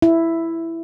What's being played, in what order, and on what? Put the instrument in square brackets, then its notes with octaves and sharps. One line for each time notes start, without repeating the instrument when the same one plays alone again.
[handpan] E4